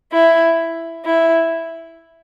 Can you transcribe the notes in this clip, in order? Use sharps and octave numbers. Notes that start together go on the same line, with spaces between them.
E4
E4